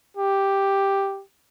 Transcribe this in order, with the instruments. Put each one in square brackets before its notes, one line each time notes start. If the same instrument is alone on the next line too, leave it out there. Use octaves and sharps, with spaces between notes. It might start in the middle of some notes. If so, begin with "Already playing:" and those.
[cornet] G4